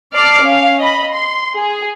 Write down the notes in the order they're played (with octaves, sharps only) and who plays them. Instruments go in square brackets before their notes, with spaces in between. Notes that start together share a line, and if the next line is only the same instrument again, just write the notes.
[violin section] D5 A5 D6 F6 C7
C#4 F5
D#5 B5
C6
G#4